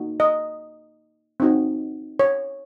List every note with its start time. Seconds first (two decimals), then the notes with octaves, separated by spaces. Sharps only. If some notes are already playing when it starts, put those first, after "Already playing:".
Already playing: A#3 D#4 F#4
0.20 D#5
1.40 C4 D#4 F#4
2.19 C#5